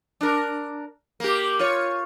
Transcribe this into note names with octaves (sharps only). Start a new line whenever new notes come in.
D4 A#4
A#3 G4
F4 C#5